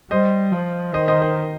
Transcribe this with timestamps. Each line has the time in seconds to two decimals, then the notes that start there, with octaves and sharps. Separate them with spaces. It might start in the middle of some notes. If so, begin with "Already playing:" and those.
0.11 G3 C5 D#5
0.52 F3
0.94 D#3 C5 D#5
1.08 C5 D#5
1.22 C5 D#5